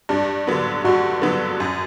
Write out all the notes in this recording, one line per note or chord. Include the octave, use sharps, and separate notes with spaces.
G2 D4
D3 F#3 B3
G2 F#4
D3 F#3 B3
F#2